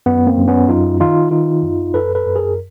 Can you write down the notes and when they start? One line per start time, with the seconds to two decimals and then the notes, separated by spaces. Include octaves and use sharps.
0.06 F#2 B3
0.27 A#3 C4
0.37 F#2
0.48 B3 C#4
0.69 F#2 D#4 F4
1.00 D#3 D#4 F4
1.31 D#3 D#4 F4
1.63 F#2
1.94 F#2 A4 B4
2.15 A4 B4
2.26 F#2
2.36 G#4 A#4